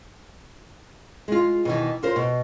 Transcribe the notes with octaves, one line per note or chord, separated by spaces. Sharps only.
G#3 F4
B2 D#3 E3
F4 A#4 C5
B2